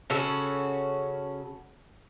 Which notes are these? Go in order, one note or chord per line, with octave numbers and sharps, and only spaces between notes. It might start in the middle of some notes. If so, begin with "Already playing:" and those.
C#3 C#4 F#4 A4